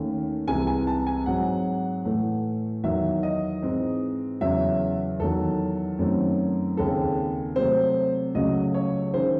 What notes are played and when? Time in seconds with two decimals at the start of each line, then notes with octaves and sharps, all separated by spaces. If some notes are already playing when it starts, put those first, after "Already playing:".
Already playing: D#2 D#3 A3 C#4
0.48 C2 C3 E3 G#3 G#5
0.67 G#5
0.87 A5
1.07 G#5
1.26 G#2 F#3 C4 F#5
2.05 A2 E3 A3
2.83 E2 D#3 F#3 E5
3.23 D#5
3.62 G#2 E3 C4
4.41 E2 C#3 F#3 C#4 E5
5.20 E2 D#3 F#3 A4
5.99 F#2 D#3 F#3 A3 C4
6.77 D#2 C#3 G#3 C4 A4
7.56 C3 F#3 A3 C5
8.35 C#2 C#3 F#3 A3 C#4 D#5
8.74 C#5
9.14 D#3 G#3 C#4 C5